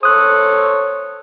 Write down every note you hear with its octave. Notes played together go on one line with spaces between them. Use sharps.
A4 C5 C#5 D#6 F#6